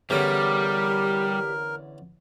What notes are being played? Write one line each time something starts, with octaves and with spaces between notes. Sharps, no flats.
E2 D3 G3 C#4 G4 A#4